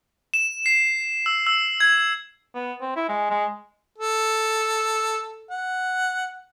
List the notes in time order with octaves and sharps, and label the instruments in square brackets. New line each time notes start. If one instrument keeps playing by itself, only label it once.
[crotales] E7
C7
E6
E6
G#6
[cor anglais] B3
C4
E4
G#3
G#3
[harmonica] A4
F#5